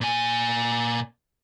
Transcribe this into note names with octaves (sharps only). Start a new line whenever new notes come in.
A#2 G#5